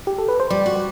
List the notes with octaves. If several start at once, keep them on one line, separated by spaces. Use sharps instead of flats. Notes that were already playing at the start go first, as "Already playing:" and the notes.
G4
A4
B4
C5
G3 D5
F#4